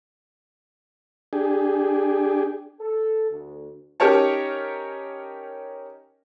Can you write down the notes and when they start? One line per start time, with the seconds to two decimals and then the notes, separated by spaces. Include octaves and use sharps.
1.33 D4 G4 G#4
2.80 A4
3.30 D2
4.00 C#4 D#4 G4 A#4 C#5 A5